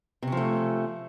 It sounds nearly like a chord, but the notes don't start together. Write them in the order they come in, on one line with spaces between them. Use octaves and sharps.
C3 C#4 F3 A3